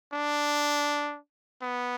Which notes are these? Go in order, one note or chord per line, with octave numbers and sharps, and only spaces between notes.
D4
B3